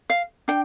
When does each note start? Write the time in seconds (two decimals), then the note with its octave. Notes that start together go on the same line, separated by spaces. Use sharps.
0.10 F5
0.48 D4 G5